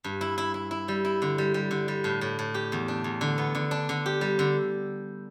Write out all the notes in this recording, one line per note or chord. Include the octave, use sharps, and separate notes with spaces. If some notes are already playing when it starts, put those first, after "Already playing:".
G2
E4
E4
E4
E4
G3
E4
D3
G3
G3
D3
G3
A2
A2
A2
G4
E2
D4
E2
D3
B3
D3
D4
D3
G4
G3
D3